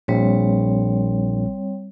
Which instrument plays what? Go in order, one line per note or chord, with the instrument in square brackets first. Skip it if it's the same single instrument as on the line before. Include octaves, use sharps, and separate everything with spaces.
[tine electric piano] A#1 [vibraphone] G3 C4 C#5